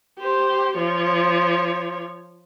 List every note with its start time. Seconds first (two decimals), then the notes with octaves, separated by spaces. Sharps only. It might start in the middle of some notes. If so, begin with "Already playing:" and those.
0.19 G4 C5
0.77 F3 C#5